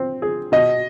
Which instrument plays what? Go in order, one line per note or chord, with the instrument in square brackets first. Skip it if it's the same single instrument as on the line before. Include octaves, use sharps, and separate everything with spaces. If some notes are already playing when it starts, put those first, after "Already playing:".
Already playing: [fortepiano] C4
G#4
[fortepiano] B2 [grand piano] D#5